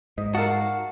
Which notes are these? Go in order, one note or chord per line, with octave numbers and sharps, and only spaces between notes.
G#2 D#5
F#4 A#4 F5 A5